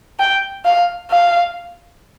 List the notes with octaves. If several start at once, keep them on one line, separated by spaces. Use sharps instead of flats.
G5
F5
F5